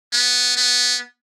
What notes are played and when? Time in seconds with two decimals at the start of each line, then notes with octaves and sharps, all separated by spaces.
0.13 B3
0.57 B3